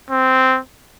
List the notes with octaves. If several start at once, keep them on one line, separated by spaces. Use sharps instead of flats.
C4